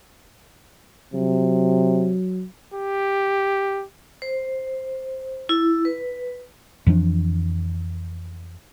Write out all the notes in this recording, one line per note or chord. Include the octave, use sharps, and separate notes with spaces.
C3 F#3
G4
C5
E4
B4
F2 E3 F3 D4